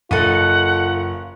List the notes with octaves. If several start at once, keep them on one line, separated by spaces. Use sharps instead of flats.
F#1 F4 A4 D#5 F#5